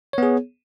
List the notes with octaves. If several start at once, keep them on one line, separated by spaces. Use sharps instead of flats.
B3 G#4 C#5